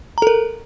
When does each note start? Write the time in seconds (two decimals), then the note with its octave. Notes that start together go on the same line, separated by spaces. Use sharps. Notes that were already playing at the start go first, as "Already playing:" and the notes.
0.18 A#5
0.22 A4
0.27 A#4